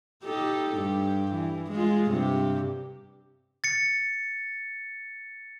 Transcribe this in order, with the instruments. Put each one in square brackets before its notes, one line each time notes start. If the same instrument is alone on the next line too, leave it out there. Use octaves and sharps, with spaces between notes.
[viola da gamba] D#4 G4 A4
G2 G4
E3
G#3 F4
G2 C3 G4
[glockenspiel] A6 C#7